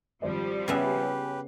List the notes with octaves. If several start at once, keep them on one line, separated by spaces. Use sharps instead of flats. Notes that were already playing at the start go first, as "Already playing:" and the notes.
G#1 F3 G3 C5 D5
C#3 B3 G4 B4 C#5 E5 G#5 C7